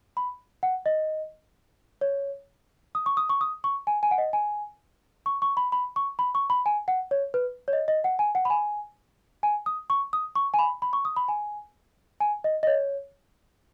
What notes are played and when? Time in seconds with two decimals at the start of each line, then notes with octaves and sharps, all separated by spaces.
0.17 B5
0.63 F#5
0.86 D#5
2.01 C#5
2.95 D#6
3.06 C#6
3.17 D#6
3.30 C#6
3.41 D#6
3.64 C#6
3.87 G#5
4.03 G#5
4.11 F#5
4.18 D#5
4.33 G#5
5.26 C#6
5.42 C#6
5.57 B5
5.72 B5
5.96 C#6
6.19 B5
6.35 C#6
6.50 B5
6.66 G#5
6.88 F#5
7.11 C#5
7.34 B4
7.68 C#5
7.73 D#5
7.88 D#5
8.04 F#5
8.19 G#5
8.35 F#5
8.45 B5
8.50 G#5
9.43 G#5
9.66 D#6
9.90 C#6
10.13 D#6
10.35 C#6
10.54 G#5
10.59 B5
10.82 B5
10.93 C#6
11.05 D#6
11.16 B5
11.28 G#5
12.20 G#5
12.44 D#5
12.63 D#5
12.67 C#5